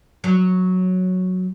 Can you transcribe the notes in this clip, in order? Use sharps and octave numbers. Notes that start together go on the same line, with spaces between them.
F#3